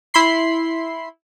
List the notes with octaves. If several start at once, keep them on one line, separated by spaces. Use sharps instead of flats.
E4 B5 C6 C7